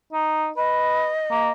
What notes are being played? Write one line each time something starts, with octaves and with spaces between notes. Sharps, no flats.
D#4
B4 D#5
A#3